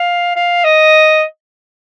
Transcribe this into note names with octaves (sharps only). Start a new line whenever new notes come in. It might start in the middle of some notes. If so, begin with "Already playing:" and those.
Already playing: F5
F5
D#5